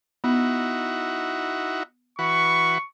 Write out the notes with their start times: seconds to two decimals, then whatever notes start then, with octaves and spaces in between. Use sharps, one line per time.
0.24 B3 D#4 E4 F#4
2.19 E3 F#4 B4 C#6